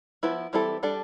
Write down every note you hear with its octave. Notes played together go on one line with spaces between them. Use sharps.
F3 B3 E4 B4
E3 G3 C4 E4 A4
G3 D4 A4